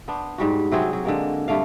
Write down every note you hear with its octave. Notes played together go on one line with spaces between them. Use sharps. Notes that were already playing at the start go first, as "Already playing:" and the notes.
B3 D4 C5
G#2 G3 F#4
C3 F#3 C4 G#4
F#3
D3 G#3 A#3
G2 A3 D5 F5